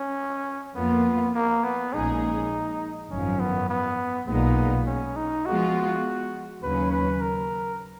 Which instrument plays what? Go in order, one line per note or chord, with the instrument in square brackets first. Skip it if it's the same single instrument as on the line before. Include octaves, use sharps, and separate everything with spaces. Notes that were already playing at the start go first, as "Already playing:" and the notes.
Already playing: [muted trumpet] C#4
[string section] F2 F3 A#3 F4 [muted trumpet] B3
[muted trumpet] A#3
B3
[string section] A#1 A#2 G#3 C#4 G#4 [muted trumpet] D#4
[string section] G#1 F#2 F3 [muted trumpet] C#4
[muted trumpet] B3
B3
[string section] B1 A#2 G#3 D#4 [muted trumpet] B3
[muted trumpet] C#4
D#4
[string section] F3 G#3 B3 F4 [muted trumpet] F#4
[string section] D#2 C#3 F#3 C#4 [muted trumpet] B4
[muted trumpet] B4
A#4